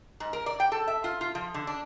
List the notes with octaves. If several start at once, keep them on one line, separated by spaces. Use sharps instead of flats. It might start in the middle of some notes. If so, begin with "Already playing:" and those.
G#2
A#4
D5
G5
A4
E5
F4
F4
F3
D3
D4